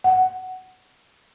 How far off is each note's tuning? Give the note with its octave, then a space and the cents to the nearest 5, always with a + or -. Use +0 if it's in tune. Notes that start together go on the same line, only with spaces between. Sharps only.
F#5 +10